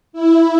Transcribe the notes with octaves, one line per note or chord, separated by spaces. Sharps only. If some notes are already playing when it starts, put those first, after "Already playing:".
E4